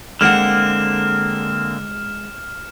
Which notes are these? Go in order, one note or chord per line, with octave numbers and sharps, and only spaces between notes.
D3 G#3 A#3 C4 F#5 F6 E7